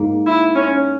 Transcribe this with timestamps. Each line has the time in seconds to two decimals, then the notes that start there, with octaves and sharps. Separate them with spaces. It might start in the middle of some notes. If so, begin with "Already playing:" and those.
Already playing: G#2 A#3
0.27 E4
0.55 C#4